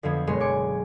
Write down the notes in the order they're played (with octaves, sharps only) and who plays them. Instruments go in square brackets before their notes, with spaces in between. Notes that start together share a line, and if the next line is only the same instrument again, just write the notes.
[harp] F2 D3 F3 B3 G#6
F#1 B2 G#3 C#5 C6
G#5 D6 C#7